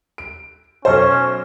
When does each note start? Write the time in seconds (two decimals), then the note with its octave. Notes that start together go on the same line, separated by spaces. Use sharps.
0.18 D7
0.85 B1 C#4 A4 C5